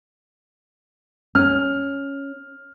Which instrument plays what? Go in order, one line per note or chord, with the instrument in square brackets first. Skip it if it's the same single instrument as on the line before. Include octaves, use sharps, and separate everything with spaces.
[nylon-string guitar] C#4 [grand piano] F6